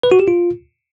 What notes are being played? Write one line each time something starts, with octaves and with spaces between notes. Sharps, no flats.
B4
F#4
G4
F4